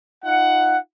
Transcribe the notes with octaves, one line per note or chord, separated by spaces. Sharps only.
D#4 F4 F#5